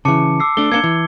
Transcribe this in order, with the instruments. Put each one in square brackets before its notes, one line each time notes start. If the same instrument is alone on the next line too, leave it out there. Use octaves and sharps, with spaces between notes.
[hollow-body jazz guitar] C#3 E3 [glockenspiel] A5 D6 C#7
[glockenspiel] D6 E6 C7
[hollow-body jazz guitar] A3 D4 [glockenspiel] G7
[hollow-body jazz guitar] A#3 B3 D4 [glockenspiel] G#6 C#7 G7
[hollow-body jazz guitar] E3